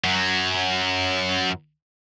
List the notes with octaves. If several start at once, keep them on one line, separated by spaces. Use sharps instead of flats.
F#2 F#3